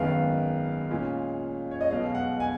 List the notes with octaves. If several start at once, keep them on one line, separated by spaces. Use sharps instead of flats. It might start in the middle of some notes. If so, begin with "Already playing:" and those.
Already playing: G#1 F#2 D#3 G#3 B3 F5
A#2 G#3 C#4 F4
C#5
D#5
B1 B2 G#3 F5
F#5
G#5